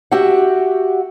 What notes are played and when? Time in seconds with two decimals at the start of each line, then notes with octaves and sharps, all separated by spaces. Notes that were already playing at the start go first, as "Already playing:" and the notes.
0.12 F#4 G4 E5 F#5